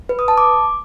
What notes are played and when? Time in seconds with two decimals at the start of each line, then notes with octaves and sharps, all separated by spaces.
0.09 B4
0.19 D#6
0.28 A5
0.38 D6